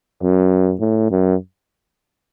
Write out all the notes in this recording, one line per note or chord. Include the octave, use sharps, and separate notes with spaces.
F#2
A2
F#2